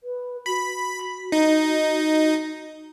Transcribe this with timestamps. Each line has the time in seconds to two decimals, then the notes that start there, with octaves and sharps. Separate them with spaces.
0.03 B4
0.46 F#4 B5
1.32 D#4